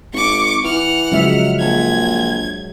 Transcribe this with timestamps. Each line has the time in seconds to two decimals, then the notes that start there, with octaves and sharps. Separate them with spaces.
0.13 G#1 C#6 D6
0.64 E3 F#5 F6
1.12 C#3 F3 F#3 G#3 E5
1.60 A#1 G#6